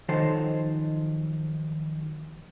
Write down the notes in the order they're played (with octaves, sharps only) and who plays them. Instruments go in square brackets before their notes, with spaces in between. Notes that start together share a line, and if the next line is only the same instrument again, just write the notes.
[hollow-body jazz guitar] D#3 F3 F#3 D#4 A4 C5